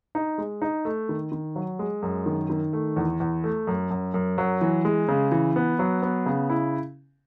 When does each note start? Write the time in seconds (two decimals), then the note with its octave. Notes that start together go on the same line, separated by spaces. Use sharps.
0.15 D#4
0.38 G#3
0.62 D#4
0.85 A3
1.09 D#3
1.32 D#3
1.56 F#3
1.79 G#3
2.02 F#2
2.26 D#3
2.50 D#3
2.73 A3
2.96 E2
3.20 E2
3.44 A3
3.67 F#2
3.91 F#2
4.14 F#2
4.38 F#3
4.61 E3
4.85 G#3
5.08 C#3
5.32 E3
5.56 B3
5.79 F#3
6.02 B3
6.26 C#3
6.50 E4